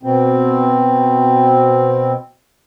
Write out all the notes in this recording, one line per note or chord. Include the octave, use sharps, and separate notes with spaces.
B2 C4